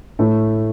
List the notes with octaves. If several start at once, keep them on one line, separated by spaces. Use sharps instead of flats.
A2 A3